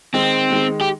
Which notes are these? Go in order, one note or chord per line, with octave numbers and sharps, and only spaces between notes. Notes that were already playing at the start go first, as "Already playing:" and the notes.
D#3 G#3 C4 D#4
D#3 G#3 D#4
G4